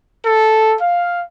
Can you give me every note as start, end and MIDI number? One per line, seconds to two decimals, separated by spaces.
0.25 0.74 69
0.81 1.21 77